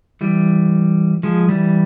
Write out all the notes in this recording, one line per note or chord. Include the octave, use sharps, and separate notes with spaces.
E3 G3
F3 G#3
E3 G3